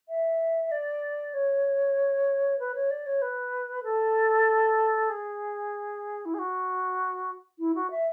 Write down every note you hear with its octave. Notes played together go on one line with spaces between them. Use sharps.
E5
D5
C#5
B4
C#5
D5
C#5
B4
A4
G#4
E4
G#4
F#4
E4
F#4
E5